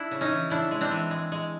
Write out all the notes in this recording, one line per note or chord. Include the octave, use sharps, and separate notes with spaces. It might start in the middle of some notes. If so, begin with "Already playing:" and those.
Already playing: D4 E4
C#3
C#4 D#4
E3
C#3 D4 E4
G#3
C4 D4
E3
G#3
G#3